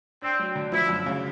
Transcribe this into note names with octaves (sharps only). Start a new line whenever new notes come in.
C4 D4
F#3
D3
F3 E4
F#2
C#3